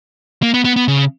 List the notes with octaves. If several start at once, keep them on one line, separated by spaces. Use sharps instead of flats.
A#3
B3
B3
B3
C#3